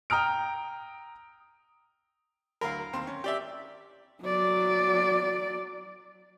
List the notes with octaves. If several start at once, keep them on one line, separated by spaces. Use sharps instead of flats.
G5 A#5 D#6 F6 D7
D2 F#3 A#4 F5 B5
D#2 C4 C6
C#4
G4 D5 E5
F#3 D5